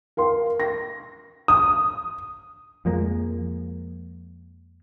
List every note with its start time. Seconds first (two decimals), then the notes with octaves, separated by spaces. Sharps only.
0.17 A#4 F5 C6
0.60 A#6
1.48 D#6
2.85 F2 F3 G#3 A#3